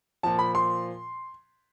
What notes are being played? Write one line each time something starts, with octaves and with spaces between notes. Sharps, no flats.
A#2 F3 A5
B5
C6